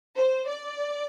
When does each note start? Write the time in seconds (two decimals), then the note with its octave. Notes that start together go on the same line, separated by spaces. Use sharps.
0.16 C5
0.47 D5